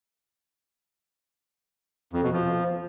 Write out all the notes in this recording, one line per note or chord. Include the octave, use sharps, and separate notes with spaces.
F2
B2
F3